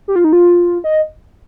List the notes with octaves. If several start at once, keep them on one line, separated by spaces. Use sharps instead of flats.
G4
F4
D#4
F4
D#5